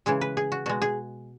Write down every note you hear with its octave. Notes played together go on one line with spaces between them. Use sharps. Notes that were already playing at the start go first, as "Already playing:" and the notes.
C#3 E3 G#3 G#4
B4
G#4
F#4
B2 G#3 F#4
G#4